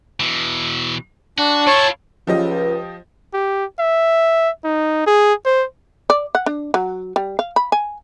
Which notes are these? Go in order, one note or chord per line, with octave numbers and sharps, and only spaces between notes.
B2 E3
D4 F#4
E4 F4 C#5 A5 C#6
C#2 F3 G4 D#5
G4
E5
D#4
G#4
C5
D5
F#5
D4
F#3
G3
F5
B5
G#5